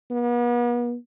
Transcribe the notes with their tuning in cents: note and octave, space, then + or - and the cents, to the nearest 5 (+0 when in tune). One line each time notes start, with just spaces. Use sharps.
B3 -40